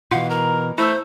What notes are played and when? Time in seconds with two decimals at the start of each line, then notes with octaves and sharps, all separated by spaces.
0.11 B2 E3 F4 F5 F#5
0.30 A#4 A#5
0.78 A3 E4 C5 E6